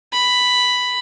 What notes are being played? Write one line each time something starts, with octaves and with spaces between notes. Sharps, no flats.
B5